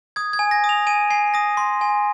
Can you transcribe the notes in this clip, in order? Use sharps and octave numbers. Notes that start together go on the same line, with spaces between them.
D#6 G#6
G#6
G#5
A#6
D#6
F7
G#5 D#7
G#5 C7
D#6 A#6
C6
G#5